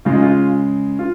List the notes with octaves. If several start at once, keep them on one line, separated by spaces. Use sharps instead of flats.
C#3 G#3 F4
D#4
F4
F4